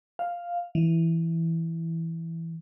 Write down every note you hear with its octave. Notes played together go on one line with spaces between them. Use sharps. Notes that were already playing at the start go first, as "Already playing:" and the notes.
F5
E3